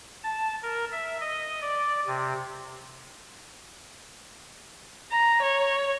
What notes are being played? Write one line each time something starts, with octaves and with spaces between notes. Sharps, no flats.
A5
A#4
E5
D#5
D5
C3
A#5
C#5